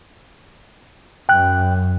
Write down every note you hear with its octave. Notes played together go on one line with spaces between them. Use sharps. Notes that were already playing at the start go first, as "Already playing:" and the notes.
F#2 G5 F#6